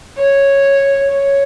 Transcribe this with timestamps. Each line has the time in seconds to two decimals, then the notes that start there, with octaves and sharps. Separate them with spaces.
0.18 C#5
1.10 C#5